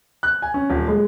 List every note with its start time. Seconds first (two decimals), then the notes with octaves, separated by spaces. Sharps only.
0.23 F#6
0.42 G#5
0.54 C#4
0.70 D#1
0.88 G#3